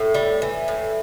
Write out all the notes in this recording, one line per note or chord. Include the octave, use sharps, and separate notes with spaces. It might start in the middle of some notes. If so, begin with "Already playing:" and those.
Already playing: A2
G3
E3
A2